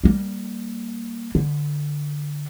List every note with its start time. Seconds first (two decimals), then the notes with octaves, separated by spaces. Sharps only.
0.04 G3 A#3
1.35 D3